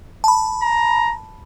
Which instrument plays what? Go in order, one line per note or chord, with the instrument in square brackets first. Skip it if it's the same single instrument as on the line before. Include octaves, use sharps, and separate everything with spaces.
[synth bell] A5 B5
[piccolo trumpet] A#5